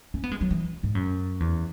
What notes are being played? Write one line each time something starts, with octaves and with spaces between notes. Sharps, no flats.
C#4
B3
G#3
F#3
E3
G#2
F#2
E2